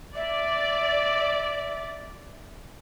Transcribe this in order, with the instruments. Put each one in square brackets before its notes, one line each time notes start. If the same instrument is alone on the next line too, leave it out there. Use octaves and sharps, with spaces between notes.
[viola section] D5 [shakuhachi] E5